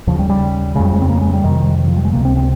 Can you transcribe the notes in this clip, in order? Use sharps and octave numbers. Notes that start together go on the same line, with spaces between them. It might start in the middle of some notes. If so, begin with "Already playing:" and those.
D#2 C#3 F3
G3
G3
F2 C#3 G#3
G3
G#3
C4
A#3
G#3
G3
F2 C3 D#3
D#3
F3
G3
G#3
C#2 C3 A#3
C4
C4